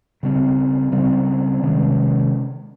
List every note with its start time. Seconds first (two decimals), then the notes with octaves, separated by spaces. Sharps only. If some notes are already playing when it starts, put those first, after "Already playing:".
0.23 C#3 G3 C4
0.92 C#3 G3 C4
1.62 C3 D#3 G#3 C#4